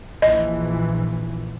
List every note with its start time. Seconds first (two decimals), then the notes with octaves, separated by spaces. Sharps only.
0.22 A#1 E3 D#5